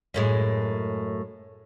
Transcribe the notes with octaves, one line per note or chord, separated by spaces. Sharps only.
F#2 A2 G#3